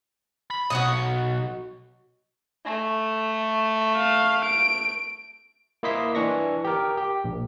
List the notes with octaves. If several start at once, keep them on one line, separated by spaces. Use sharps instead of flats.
B5
B1 F#4 C#5 D#5
A3
F5
D7
A#3 E4 D#5 C6 B6
E3 D4 C#6 A#6
G4 A#4
G4
A#1